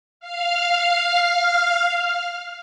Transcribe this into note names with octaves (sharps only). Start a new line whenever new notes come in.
F5 F6